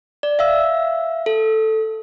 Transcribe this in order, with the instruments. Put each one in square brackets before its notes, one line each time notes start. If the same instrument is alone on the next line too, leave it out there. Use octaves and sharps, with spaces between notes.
[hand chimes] D5
E5 F5 E6
A4